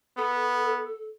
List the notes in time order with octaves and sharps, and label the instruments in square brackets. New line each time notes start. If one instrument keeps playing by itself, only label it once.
[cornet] B3 [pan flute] A4